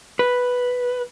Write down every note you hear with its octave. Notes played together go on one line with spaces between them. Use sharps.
B4